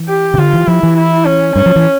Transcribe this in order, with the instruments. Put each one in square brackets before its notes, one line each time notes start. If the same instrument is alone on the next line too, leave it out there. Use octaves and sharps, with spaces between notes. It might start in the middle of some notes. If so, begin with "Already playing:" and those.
Already playing: [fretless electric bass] E3
[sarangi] G4
[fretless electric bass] C#3
[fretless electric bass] D3 [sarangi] F4
[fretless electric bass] E3
[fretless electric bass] F3 [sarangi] E4
[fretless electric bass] E3
[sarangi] E4
C#4
[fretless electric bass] G2 [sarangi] C#4
[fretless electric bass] F3
E3